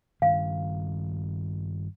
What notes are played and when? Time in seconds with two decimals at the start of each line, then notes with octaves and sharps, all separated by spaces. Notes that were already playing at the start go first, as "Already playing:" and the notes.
0.22 G2 D#3 F5